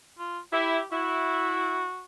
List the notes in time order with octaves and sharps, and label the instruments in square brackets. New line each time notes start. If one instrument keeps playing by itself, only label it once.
[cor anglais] F4
[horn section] E4 [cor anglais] G4
[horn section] E4 [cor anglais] F#4